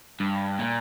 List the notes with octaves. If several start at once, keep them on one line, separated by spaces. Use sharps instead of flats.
G2
A#2